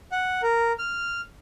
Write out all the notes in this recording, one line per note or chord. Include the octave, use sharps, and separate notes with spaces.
F#5
A#4
F6